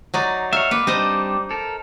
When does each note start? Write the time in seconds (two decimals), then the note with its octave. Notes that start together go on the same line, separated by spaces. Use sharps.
0.14 F#3 D#4 D5
0.53 C#5 E5 F5 E6
0.71 A#3 B4 D6
0.87 G3 C4 D4 D#4 C5 D#5
1.51 A4 A#4